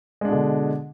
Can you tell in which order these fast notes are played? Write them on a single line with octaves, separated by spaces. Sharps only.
G#3 D4 B2 D3